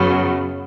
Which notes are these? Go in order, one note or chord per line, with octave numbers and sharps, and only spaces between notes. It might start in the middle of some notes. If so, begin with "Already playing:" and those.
Already playing: F#2 C#3 F#3 B3